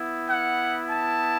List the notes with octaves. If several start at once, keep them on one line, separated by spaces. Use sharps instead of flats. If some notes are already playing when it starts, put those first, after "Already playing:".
Already playing: B3 E4
F#5
A5